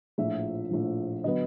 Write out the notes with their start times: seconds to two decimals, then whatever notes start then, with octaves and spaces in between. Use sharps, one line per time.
0.18 A#1 A2 F3 E5
0.71 A#1 A2 F3
1.24 D3 F#3 B3 D#5